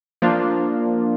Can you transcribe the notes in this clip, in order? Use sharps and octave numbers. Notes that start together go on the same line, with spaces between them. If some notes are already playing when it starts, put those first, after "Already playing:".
F3 A#3 D4 F4